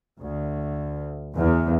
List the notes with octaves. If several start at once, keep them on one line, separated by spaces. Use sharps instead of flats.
D2
E2